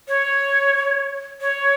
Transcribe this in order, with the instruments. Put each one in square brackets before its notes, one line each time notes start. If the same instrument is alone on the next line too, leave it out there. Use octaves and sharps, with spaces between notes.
[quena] C#5
C#5